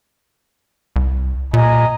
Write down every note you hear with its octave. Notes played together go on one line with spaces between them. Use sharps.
C2
A#2 D#5 G#5 A#5